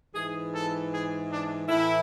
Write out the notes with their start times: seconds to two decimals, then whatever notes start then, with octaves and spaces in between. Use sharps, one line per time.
0.15 G#2 E3 G#4
0.53 A4
0.92 G#4
1.30 D4
1.67 A2 E3 E4